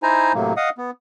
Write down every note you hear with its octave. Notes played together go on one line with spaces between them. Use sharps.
D#4 E4 C5 G#5 A#5
A2 C3 F#3 A#3
D#5 F5 F#5 D#6
B3